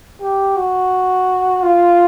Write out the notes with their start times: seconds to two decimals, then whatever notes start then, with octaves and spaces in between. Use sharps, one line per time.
0.21 G4
0.56 F#4
1.63 F4